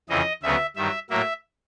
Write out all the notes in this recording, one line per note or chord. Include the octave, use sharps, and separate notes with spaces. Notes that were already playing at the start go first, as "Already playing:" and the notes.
F2 C#3 E3 D#5
D2 C#3 F#3 B3 E5
G2 D#3 F#3 E5
A2 F#3 A#3 E5